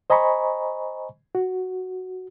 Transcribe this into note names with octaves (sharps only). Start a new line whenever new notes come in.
C5 D#5 G#5 A#5 B5 C#6
F#4